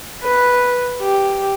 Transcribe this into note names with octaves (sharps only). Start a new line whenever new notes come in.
B4
G4